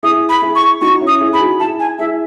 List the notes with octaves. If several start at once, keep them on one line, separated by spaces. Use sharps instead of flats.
E4 G#4 D#6
B5
E4 G#4
C#6
D#4 F#4 C#6
C#4 E4
D#6
E4 G#4
G#4 B5
D#4 F#4
E4 G#4 A5
G#5
E4 G#4 E5